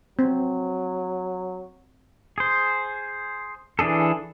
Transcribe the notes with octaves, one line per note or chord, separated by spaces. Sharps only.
F#3 C4
G#4 C5
E3 D4 G#4 A4